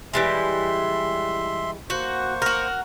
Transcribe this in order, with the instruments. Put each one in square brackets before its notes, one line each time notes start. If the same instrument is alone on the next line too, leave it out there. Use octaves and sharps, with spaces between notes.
[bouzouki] E3 G3 G#3 [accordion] E5 C6
[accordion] A#3 C5 C#6 [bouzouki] F#4
[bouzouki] F#4 A#4